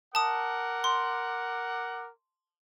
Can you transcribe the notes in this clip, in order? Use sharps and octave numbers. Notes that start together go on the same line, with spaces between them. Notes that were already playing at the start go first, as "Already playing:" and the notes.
A#4 F#5 A5 D6 D#6
C6